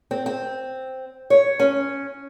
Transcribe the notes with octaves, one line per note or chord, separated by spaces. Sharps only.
C4
C4
C#5
C#4